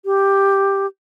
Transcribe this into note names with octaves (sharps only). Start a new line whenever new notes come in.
G4